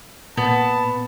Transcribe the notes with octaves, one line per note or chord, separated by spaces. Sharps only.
A#2 B3 A5